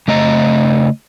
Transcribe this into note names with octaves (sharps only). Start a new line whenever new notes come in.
C#3 A3 D#5 A#5